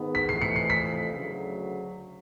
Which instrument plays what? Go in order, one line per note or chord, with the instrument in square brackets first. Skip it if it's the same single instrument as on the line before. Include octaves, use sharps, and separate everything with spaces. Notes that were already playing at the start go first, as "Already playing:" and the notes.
Already playing: [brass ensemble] G#2 D#3 G#3 B3
[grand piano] B6
[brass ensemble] F2 C3 E3 A3 [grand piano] C7
[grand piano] C#7
C7
B6
[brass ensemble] D2 C#3 F#3